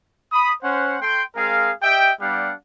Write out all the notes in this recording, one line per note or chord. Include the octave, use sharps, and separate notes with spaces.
B5 D#6
C#4 C5 F#5
A3 G5 C6
G#3 C4 G#4 A#4 F5
G4 D#5 E5 G5
G3 B3 D4 G4 F5 F#5